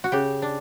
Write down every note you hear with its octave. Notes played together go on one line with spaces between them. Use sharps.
F#4
C#3 G4
D4